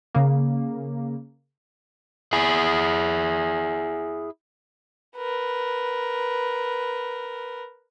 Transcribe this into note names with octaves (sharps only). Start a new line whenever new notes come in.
C#3 A#3
E4 G#4
A#4 B4